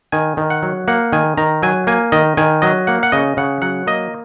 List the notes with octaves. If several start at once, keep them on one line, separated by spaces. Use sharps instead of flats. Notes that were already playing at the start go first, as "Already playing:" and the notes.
D#3 G#5
D#3
F#5
F#3
A#3 F#5
D#3 G#5
D#3 A#5
F#3 G#5
A#3 G#5
D#3 D#5
D#3 G#5
F#3 D#5
A#3 F#5
F#5
C#3 D#5
C#3 F#5
F#3 F#5
A#3 D#5